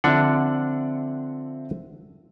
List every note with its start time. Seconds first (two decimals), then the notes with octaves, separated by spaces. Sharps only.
0.04 D3 F3 C4 D4 E5 F#5